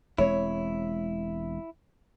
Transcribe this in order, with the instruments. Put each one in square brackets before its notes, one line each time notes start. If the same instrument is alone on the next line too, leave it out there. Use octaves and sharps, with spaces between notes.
[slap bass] E1 G#3 C4 [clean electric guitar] E4 [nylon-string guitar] C#5